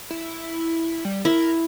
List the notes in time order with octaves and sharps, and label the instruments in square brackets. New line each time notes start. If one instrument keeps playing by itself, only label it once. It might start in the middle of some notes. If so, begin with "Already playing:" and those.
[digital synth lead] E4
G3
[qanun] E4 [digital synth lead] A#4